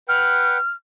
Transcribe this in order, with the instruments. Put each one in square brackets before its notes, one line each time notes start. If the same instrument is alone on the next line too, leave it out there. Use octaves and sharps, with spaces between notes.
[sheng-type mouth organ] B4 F#5 G5 [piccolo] F6